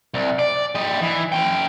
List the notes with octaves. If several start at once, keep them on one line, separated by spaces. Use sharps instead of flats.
C2
D5
G3 D#5
E3
C#4 G5